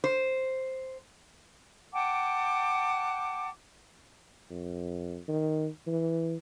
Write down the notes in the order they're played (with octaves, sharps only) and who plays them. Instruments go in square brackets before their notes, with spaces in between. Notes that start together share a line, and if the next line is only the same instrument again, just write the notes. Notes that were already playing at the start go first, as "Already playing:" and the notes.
[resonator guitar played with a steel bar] C5
[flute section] F#5 G5 A5 D6
[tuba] F2
D#3
E3